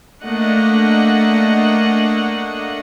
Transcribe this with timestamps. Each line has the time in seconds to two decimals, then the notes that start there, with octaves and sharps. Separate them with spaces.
0.25 A3 A#3 D4 D#5 F#5